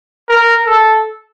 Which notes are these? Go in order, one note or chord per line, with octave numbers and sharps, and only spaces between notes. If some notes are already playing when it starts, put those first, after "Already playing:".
A#4
A4